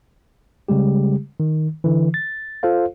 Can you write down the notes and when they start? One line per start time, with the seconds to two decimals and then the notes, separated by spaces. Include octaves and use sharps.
0.68 C#3 G3 G#3 G4
1.40 D#3
1.84 D3 E3
2.14 A6
2.63 F4 A4 C5 F5